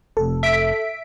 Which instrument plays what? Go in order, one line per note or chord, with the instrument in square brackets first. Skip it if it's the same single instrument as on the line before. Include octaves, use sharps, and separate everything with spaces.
[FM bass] F1 [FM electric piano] A4
[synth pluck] E5 B6 D7